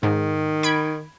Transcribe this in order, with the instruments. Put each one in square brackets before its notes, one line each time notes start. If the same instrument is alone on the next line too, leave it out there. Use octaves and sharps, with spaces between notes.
[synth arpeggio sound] G#2 [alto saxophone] D#3
[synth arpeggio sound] B5 G#6 D7